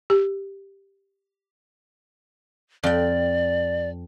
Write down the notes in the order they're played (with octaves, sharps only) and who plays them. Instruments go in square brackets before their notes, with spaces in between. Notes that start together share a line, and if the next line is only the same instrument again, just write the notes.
[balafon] G4
[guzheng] F2 G5 [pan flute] D5